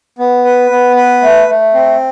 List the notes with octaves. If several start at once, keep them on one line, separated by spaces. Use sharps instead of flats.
B3
B4
B3
B4
A3
A3
C4